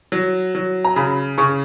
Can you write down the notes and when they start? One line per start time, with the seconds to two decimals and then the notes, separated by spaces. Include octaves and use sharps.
0.12 F#3
0.55 F#3
0.85 A#5
0.96 C#3 B5
1.38 C#3 C#6